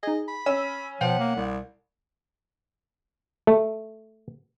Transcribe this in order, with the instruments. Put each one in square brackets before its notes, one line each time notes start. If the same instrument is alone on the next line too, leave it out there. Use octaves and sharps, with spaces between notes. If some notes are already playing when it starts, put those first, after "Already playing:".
[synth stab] D#4 G#4 [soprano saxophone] D#5
[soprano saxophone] B5
[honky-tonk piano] C#4 [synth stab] E6
[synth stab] B2 G5 [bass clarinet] F3 [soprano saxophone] F#5
[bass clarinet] A#3
C2
[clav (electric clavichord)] A3